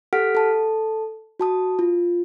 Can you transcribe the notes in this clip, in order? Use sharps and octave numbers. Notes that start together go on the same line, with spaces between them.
G4 A4 F#5 F6 B6 D7
A4 A5
F#4 A5 D#6
F4